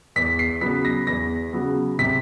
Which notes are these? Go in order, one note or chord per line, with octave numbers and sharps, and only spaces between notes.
E2 B6
C7
C#3 F#3 B3 B6
A#6
E2 A#6
C#3 F#3 B3
C3 B6